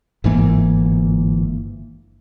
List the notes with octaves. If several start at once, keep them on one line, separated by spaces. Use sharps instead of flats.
G1 G#2 E3 A#3